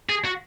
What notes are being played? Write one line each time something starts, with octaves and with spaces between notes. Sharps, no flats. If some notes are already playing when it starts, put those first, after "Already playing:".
G#4
F#4